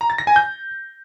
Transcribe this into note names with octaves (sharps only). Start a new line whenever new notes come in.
A#5
A6
A#6
G#5
G6